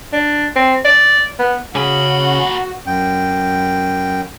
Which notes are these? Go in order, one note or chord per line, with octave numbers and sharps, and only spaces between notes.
D4
C4
D5
B3
A#2 C#3 C#4 F#4 G#4 B5
F#2 G5